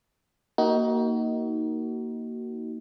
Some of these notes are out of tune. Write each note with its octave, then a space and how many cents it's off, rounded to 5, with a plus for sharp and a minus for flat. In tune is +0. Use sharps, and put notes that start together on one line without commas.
A#3 +0 D#4 +20 F#4 +30